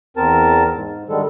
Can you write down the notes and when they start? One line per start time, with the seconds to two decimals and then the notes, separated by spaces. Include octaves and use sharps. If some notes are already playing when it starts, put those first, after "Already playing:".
0.17 E2 C4 A#4 A5
0.74 G#2
1.09 D3 D#3 G3 G#3 A4